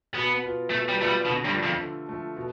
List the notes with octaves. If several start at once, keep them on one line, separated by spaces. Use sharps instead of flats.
B2 B3
B3 F4
B2 A3
G3
A3 B3 F4
G3
B2 D3
G2
F3 A3
F2
D3
F3 A3
B2